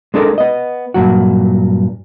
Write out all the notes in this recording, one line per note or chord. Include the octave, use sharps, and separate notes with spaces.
G#3 D4 A4 A#4
B3 D#5
G2 A#2 F#3 F#4